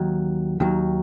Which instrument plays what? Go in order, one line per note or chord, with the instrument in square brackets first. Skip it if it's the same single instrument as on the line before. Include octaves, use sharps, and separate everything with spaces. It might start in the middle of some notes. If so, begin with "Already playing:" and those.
Already playing: [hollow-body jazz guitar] D#2 D#3 F#3
D#2 D#3 F#3